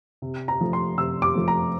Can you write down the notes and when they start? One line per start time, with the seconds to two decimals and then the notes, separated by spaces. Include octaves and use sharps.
0.22 C3
0.48 A#5
0.61 F3 A3
0.73 C6
0.98 C3 E6
1.22 D6
1.35 F3 A3
1.48 A#5